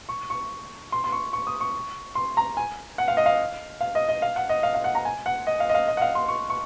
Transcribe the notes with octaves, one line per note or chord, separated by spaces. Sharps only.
C#6
C#6
C6
C6
C#6
C#6
D#6
C#6
C6
A#5
G#5
F#5
F5
D#5
F5
F5
D#5
D#5
F5
F#5
D#5
F5
F5
F#5
A#5
G#5
F#5
D#5
F5
D#5
F5
D#5
F#5
F5
C6
C#6
C#6